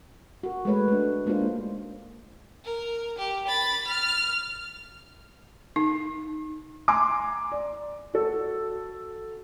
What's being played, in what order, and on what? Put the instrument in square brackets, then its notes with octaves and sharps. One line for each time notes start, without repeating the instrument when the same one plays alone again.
[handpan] F#4 A#4
G#3 A3 B4 C#5
A3 D4
G#3 A#3 D4 D#4 F4 C5
[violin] A#4
G4
B5 A6
F6
[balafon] D#4
[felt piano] G#5 A#5 C6 D6
D5
F#4 A4